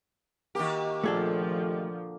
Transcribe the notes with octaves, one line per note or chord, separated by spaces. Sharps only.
D#3 A#3 F#4 G4
A#2 D3 F3 A3 G#4 A4